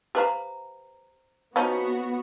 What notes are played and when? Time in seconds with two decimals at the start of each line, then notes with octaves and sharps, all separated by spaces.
0.15 G4 B4 C5 F5 A#5
1.56 F3 B3 C#4 D#4 F#4